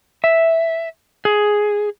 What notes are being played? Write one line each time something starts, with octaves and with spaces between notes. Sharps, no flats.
E5
G#4